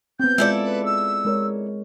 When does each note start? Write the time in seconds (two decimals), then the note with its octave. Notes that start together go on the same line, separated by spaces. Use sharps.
0.20 B3 C4 G6
0.38 G#3 E4 F4 G#4 A4 D5
0.64 B4
0.85 E6
1.25 G#3 A#4 C#5